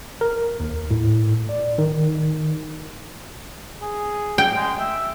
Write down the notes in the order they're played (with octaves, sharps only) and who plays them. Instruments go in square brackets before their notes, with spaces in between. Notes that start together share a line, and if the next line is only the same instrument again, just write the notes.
[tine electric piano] A#4
D#2
A2
D5
D#3
[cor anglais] G#4
[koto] G5
[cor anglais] G#3
E5